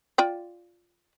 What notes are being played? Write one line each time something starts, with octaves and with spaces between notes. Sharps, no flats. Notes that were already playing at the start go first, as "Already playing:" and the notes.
F4 D5 G5